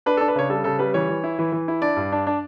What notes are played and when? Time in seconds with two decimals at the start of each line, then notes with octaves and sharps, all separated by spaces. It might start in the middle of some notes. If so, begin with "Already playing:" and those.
0.06 D4 B4
0.17 A4
0.21 D4
0.28 B4
0.36 C#3 C#5
0.50 G3 A4
0.64 C#3 A4
0.79 G3 B4
0.94 E3 C#5
1.09 E3
1.24 E4
1.39 E3
1.52 E3
1.68 E4
1.82 D4 D5
1.96 G2
2.12 D4
2.27 D4